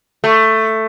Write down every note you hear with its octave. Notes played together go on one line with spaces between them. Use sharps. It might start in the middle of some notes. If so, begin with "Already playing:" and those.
A3